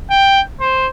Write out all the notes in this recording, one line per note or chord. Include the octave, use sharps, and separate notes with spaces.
G5
C5